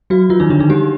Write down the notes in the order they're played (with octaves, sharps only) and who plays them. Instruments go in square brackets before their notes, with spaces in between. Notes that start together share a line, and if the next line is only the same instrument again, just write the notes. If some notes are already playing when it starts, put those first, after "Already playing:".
[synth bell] F#3 F#4
F3 F4
D#3 D#4
D3 D4
D#3 D#4
G3 G4